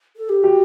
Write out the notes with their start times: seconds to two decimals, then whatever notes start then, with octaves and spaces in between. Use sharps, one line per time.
0.16 A4
0.29 G4
0.43 F#4 G4